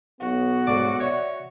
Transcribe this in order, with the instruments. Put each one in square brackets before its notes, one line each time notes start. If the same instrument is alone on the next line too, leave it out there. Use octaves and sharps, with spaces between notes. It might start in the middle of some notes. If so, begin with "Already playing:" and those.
[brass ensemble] B1 B3 [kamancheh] F#4
[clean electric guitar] G#2 A3 G#4 [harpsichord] D5
[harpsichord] C#5 [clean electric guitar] D5 E5